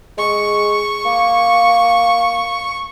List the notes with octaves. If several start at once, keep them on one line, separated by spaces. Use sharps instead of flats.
G#3 C#6
A#3